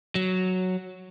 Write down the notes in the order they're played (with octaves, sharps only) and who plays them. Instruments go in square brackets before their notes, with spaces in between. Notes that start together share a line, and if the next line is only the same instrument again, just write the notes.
[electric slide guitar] F#3